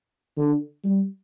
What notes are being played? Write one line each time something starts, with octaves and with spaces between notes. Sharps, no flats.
D3
G3